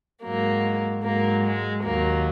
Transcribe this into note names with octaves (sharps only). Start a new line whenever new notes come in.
G#2 F#3 A#3
G#2 F#3 A#3
G#3
D#2 D#3 F#3 A#3